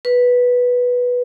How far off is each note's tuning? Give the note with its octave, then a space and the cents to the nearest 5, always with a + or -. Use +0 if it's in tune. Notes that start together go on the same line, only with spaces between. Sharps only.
B4 -5